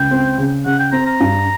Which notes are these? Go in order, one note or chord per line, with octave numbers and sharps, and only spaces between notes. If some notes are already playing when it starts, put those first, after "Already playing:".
Already playing: C#2 G5
C4
C#3
C#3 F#5
G5
C4 A#5
A#5
G2